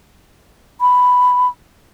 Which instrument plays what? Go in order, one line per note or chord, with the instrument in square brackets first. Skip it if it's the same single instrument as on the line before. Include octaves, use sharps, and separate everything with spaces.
[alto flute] B5